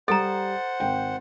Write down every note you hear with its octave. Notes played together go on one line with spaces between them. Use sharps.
G3 A4 C5 F#5 A#5 A6
G#1 G5